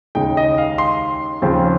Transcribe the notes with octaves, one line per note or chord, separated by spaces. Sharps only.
D#2 C#3 G#3 D#4 G5
D#5
F5
C6
D#2 C#3 F3 C4